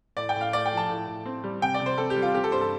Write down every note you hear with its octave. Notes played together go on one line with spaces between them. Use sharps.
A2 D5
G5
A2
F5
A3 D5
G5
F3
A5
A2
A2
C4
G3
C3 G5
D5
C3
C5
C4 A4
G4
G3
F4
C4 G4
A4
G2 C5
A4